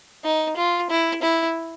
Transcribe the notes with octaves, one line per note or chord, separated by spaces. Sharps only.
D#4
F4
E4
E4